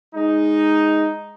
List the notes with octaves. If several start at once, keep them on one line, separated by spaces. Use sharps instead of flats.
G#3 D#4